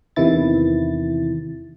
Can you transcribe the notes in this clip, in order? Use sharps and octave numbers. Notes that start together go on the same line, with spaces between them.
E2 C3 D#3 E3 E4 A6